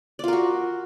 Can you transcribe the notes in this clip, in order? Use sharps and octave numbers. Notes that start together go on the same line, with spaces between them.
F4 F#4 A#4 D5